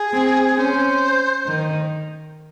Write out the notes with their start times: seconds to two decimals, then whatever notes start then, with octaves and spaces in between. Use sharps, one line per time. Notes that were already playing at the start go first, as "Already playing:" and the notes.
Already playing: G#4
0.13 C4
0.57 C#4 C5
1.47 D#3